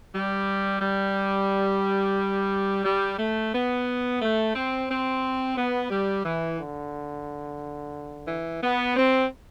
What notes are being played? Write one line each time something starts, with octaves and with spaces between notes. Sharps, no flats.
G3
G3
G3
A3
B3
A3
C4
C4
B3
G3
E3
D3
E3
B3
C4